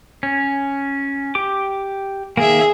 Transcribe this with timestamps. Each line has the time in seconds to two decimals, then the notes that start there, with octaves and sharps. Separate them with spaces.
0.23 C#4
1.35 G4 D6
2.37 D#3 G3 A#3 G#4 E5